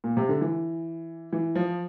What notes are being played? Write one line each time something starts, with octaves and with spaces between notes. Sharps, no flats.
A#2
C3
D3
E3
E3
F3